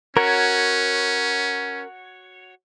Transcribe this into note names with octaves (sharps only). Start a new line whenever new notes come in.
C#4 F#4 A#4 C#5